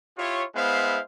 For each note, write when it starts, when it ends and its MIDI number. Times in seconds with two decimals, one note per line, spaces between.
0.18 0.45 64
0.18 0.45 65
0.18 0.45 67
0.18 0.45 73
0.55 1.00 56
0.55 1.00 59
0.55 1.00 64
0.55 1.00 72
0.55 1.00 76
0.55 1.00 77